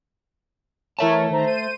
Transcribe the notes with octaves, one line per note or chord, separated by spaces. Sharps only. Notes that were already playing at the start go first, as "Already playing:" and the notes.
E3 A3 A#4 C#5 E5 A5
D#3 C5 A#5
C5 D#7